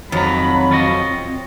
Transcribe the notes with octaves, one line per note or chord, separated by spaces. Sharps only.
F2 D#3 F#3 A#5 B5
C4 F4 C#5 D#5